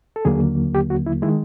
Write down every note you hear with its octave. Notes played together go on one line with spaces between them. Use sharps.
A4
D#2 D3 F#3 A#3 G#4
G4
F#4
E4
D#3 G#3 E4